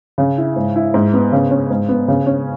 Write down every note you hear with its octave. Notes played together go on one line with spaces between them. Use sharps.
C#3
E4
G#2
E4
G#2
B3
C#3
C#4
G#2
B3
C#3
C#4